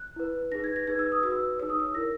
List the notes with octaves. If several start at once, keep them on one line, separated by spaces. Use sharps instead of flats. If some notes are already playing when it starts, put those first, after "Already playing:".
Already playing: F#6
E4 B4
D#4 G#4 B4 A#6
G#6
A#6
D#4 G#4 B4 G#6
E6
D#6
F#4 B4 E6
D#4 G#4 C#5 E6
D#6
E6
E4 A#4 C#5 A#6